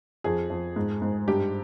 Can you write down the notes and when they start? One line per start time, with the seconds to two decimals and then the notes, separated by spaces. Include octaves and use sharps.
0.24 F2 G#4
0.50 F2
0.76 G#2
1.02 G#2
1.28 G2 G4